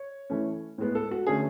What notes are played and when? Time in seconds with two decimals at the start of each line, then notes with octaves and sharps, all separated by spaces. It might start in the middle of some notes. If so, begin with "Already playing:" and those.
Already playing: C#5
0.30 E3 A3 C#4
0.78 A2 G#3 B3
0.95 A4
1.11 F#4
1.27 D3 A3 C#4 G#4